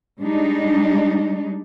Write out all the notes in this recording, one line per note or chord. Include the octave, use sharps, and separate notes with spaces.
G3 G#3 D4 D#4